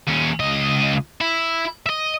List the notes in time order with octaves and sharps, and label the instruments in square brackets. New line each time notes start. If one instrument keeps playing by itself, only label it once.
[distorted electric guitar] D#2 C#4
C#2 D#5
E4
D#5 E5